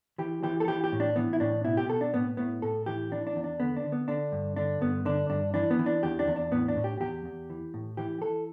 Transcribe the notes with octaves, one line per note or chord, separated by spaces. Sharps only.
E3 G4
E3 G4
A4
E3 G4
G4
A2
D4
E3 B3
E4
A2 D4
B2 E4
G4
B2 A4
D4
A2 B3
A2 B3
A2 A4
E3 G4
E3 D4
D4
E2
D4
D3 B3
D4
D3
B3
D3 D4
G2
D3 D4
G2 B3
D3 D4
G2 D4
E3 D4
B3
E3
D4
E2 G4
D4
E2
D4
A2 B3
D4
A2
G4
E2 G4
E2
E3
A2
E3 G4
E3 A4